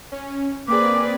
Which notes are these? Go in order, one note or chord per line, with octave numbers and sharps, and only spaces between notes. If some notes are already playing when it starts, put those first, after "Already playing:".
C#4
A#3 C4 G#4 B4 D5 D6